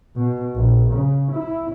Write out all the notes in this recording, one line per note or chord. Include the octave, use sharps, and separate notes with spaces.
B2
A#1
C#3
E4